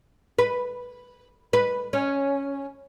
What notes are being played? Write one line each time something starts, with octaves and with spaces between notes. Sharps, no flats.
B4
B4
C#4